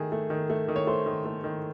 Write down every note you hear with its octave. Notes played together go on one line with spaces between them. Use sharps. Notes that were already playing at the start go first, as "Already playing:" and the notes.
Already playing: D#3 A3 G#4
A3
D#3
A3
D#3
C#5
A3 C5
D#3
A3
D#3